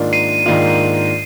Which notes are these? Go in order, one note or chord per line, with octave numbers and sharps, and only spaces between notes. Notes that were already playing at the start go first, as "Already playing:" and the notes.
Already playing: G#2 D#3 A#3 D4 F4
C7 D#7
G#2 D#3 A#3 D4 F4